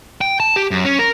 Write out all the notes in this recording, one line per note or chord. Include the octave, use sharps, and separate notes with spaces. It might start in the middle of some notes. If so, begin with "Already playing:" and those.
G5
A5
G4
F#2
C#4
A#4